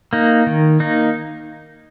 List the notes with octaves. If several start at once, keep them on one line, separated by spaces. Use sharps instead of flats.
A#3 D#4
D#3
A#3 D#4